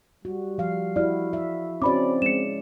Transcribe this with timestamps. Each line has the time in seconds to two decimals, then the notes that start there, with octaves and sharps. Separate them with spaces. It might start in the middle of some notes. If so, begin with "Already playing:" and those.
0.25 G3 F#4
0.58 F3 F5
0.96 E4 F#4 D5 F6
1.33 E5
1.82 C4 C#4 F#4 D5 B5 D6
2.22 G#3 C#7 E7